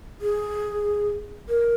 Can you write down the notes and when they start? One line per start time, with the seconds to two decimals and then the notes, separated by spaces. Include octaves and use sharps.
0.21 G#4
1.49 A#4